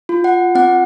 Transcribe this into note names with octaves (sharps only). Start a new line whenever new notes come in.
F4
F#5
C4 F#5